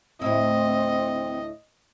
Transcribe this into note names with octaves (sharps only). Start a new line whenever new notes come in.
D2 A2 C4 E4 D#5